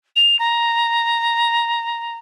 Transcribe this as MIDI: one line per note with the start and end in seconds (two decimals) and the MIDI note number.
0.16 0.36 101
0.39 2.17 82